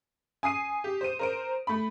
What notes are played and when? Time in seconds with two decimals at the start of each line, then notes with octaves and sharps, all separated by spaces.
0.43 G#5 D#6 C7 D#7
0.84 G4
1.01 C5 D#7
1.19 A#4 C5 D7
1.67 A3 B5